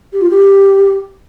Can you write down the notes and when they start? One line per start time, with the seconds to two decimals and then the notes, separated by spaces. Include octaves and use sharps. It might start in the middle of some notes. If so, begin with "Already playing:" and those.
0.13 G4
0.21 F4
0.30 G4